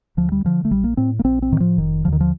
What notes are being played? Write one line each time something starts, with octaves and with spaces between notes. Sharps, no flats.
D2 F3
G3
D3 F3
A3
A#1 G3
A#3
A2 C4
A#3
A#1 C4
C4
A2 D#3
F3
F1 D#3
D#2 D3 F3
D#3
F3